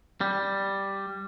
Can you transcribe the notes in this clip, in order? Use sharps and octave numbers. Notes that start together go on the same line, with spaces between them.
G3